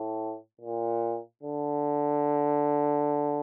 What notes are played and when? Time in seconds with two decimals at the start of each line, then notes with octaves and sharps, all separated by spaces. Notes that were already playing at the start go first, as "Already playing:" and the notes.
Already playing: A2
0.61 A#2
1.43 D3